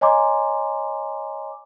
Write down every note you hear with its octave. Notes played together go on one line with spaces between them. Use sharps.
C#5 D#5 G#5 A#5 C6 D6